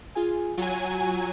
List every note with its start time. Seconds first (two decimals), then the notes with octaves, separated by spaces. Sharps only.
0.15 F4 G#4 G#5
0.58 F#3 F4 G#5